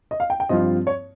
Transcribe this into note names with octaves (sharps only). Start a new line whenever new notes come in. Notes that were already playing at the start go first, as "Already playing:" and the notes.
D#5
F5
G5
G5
G2 F3 C4 F4 D#5
C#5